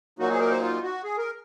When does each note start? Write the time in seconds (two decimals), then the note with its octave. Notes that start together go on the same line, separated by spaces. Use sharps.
0.19 A#2 F#3 A#3 D#4 F#4
0.30 G#4
0.35 C5
0.40 A#4
0.50 C5
0.61 F4
0.83 F#4
1.04 G#4
1.18 A#4